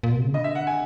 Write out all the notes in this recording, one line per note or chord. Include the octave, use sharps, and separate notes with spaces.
A#2
B2
C3
C#3
D3 D#5
E5
F#5
G#5